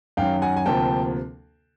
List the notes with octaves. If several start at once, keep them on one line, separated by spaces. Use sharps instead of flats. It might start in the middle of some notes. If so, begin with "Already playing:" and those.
F#2 D#3 F#3 F5 G5
F#5 G#5
G#5
D2 C3 F3 A#3 G5 A5